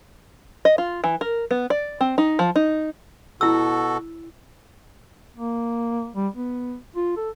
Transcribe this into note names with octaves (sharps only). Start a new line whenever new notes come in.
D#5
F4
E3
A#4
B3
D5
C4
D#4
F3
D#4
B2 E4 F#4 A4 E6
A#3
G3
B3
F4
A4